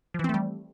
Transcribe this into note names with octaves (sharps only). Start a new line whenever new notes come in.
E3 F3 G3 A3 C4